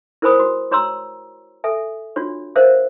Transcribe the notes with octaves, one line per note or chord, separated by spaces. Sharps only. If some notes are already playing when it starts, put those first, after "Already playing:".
E4 A#4 C5 G#5 B5 D#6
F#4
F#4 C#5 A#5 C6 E6
A4 E5 G#5
D4 F4 F#4 C#5
A#4 C5 C#5 E5 F5